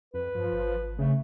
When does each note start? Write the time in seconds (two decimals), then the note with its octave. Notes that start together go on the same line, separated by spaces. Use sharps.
0.14 F2 B4
0.35 G2 F3
0.52 G#1
0.99 C#3 A3